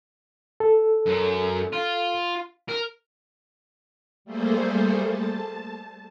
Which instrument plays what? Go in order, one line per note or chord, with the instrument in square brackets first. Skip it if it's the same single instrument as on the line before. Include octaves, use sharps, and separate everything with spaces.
[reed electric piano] A4
[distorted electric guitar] F#2
F4
A#4
[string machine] G3 A3 A#3 G#4 A4 C5
A5